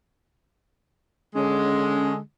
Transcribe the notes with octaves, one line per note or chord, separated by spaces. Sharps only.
D3 G#3 C#4